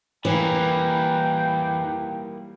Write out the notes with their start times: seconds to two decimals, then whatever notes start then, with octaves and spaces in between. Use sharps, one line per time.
0.25 E3 G3 A#3 G5